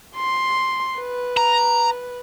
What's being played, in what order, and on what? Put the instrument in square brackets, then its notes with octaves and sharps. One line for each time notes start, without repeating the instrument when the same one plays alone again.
[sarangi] C6
B4
[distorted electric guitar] A#5